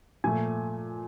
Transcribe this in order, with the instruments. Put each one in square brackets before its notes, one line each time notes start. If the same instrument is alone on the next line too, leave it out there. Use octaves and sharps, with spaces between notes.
[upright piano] A#2 F3 A3 G#5